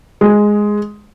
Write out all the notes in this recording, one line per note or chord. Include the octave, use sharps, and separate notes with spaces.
G#3